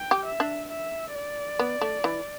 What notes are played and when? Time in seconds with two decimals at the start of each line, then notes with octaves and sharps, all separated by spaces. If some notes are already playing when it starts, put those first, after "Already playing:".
Already playing: G5
0.11 G4
0.26 E5
0.40 D4
0.70 E5
1.15 D5
1.59 B3
1.81 A3
2.04 E3